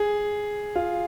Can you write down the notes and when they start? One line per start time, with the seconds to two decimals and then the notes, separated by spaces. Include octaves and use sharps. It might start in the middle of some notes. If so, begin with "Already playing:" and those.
Already playing: G#4
0.76 F4